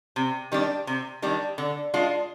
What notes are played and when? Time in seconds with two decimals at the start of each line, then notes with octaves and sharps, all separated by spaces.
0.16 C3
0.52 D#3 G3 D4
0.87 C3
1.22 D#3 G3 D4
1.58 D3
1.94 G#3 D4 F4